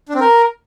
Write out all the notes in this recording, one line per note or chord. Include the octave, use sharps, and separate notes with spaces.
D4
C4
A#4